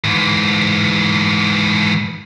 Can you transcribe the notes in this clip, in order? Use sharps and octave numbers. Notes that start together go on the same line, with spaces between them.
G#2 E3